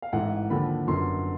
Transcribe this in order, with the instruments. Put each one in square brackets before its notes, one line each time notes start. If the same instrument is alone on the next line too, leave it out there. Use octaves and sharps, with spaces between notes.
[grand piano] F5
A1 G#2 E3 A3 F#5
D#2 D3 F3 B5
G1 F#2 D3 C6